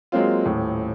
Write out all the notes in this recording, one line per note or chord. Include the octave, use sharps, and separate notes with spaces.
F#3 G#3 A#3 C4 F4
D#1 A2